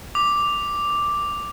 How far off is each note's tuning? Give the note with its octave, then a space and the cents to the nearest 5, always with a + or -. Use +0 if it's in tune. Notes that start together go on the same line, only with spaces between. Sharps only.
D6 +0